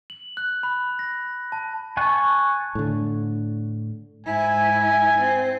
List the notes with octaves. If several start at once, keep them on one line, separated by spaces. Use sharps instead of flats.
F#7
F#6
B5
A#6
A5
G#5 A5 C#6 F#6
A2 D3
G#2 E4 G#5
C4